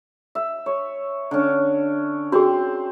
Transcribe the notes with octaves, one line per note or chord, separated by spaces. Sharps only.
E5
C#5
D3 C#4
C4 F#4 G#4